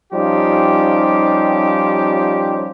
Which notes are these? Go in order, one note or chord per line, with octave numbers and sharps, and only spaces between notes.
F3 G3 C#4 D#4 F4 G4